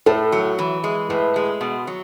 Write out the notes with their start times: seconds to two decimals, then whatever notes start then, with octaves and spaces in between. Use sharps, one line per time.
0.06 A2 A4
0.32 F#3
0.58 E3
0.84 G#3
1.09 A2 B4
1.36 G#3
1.61 B2
1.87 F#3